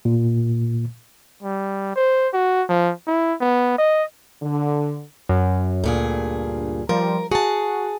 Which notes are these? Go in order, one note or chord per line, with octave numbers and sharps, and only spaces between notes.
A#2
G3
C5
F#4
F3
E4
B3
D#5
D3
F#2
D2 G2 A#2 G#4
F3 G3 A#4
F#4 G#4 A5